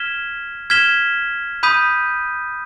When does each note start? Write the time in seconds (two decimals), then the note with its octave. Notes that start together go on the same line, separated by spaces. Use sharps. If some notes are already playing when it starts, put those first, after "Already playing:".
Already playing: F6 G#6 B6 E7 G7
0.70 F6 G#6 B6 E7 G7
1.63 B5 D#6 G6 B6 D#7